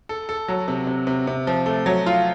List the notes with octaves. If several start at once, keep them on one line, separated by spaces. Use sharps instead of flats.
A4
A4
F#3
C3
C3
C3
C3
F3
A3
F#3
F4